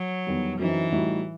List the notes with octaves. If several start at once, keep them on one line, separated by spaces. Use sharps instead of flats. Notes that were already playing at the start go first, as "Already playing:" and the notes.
Already playing: F#3
E2 D#3 G3
F#2 E3 F#3 C4 D#4
A2 G3 D#4 F#4